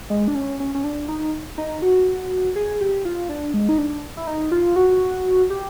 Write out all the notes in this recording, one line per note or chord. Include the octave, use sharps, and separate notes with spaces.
G#3
D4
C#4
C#4
C#4
D4
D#4
D#4
F#4
G#4
G4
F4
D4
G#3
D#4
D4
E4
D#4
F4
F#4
G4